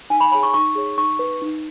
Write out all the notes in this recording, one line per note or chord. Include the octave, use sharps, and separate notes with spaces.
D#4 G#5
B5
G#4 C#5 B5
C#6
D#4 C#6
G#4 C#5
D#4 C#6
B4
D#4